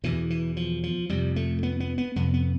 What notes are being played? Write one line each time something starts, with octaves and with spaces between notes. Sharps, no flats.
E2 B2 E3
E3
F3
F3
F2 C3 G3
A3
B3
B3
B3
F2 C3 B3
B3